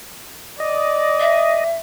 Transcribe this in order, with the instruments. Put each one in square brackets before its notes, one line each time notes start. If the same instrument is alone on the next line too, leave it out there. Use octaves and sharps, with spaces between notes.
[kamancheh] D5 [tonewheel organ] D#5
[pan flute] E5